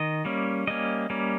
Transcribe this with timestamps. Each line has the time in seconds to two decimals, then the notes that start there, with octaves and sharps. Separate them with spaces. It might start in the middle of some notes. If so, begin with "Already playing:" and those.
Already playing: D#3 D#5
0.25 G3 A#3 C#4
0.67 G3 A#3 C#4 D#5
1.10 G3 A#3 C#4